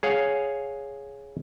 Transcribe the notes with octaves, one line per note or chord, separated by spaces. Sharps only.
G#4 C#5 F5 F#5